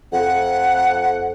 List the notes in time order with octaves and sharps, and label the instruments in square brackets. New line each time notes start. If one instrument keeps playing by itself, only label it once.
[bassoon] F2 [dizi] F#5